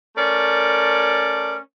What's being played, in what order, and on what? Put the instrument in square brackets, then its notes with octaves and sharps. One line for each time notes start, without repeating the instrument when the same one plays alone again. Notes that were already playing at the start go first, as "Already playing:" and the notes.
[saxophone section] A3 C#4 A#4 D5